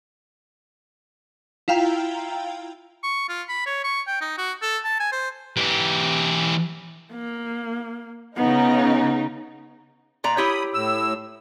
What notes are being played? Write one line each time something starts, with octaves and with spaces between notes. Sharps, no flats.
E4 F4 F5 G5 A#5
C#6
F4
B5
C#5
C#6
G5
D#4
F#4
A4
A5
G#5
C5
E3 G4
A#3
C#3 B3 D#4
A#2 D5 A#5
E4 G4 C#5 B5 D#6
A2 E6